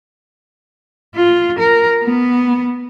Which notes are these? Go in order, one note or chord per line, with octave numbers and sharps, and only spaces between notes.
F4
A#4
B3